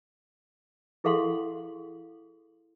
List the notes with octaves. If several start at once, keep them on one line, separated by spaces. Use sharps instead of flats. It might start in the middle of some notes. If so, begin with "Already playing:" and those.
E4 G#4 A4 F5 F#5 C6